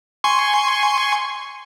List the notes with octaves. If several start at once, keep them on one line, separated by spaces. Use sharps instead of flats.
G#5 C6 C#6